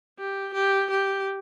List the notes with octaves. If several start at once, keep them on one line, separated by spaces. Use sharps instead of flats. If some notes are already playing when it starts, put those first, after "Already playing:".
G4
G4
G4